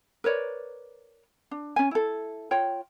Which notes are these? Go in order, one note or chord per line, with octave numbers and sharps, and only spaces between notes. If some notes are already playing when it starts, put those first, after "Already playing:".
A#4 B4 C#5 D5
D4
C#4 G#5
E4 A4
F4 C#5 G5